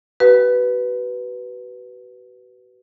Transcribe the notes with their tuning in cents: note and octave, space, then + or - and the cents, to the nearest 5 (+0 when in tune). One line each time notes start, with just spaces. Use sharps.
F#4 +40 B4 +0